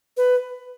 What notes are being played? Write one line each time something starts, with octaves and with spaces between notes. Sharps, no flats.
B4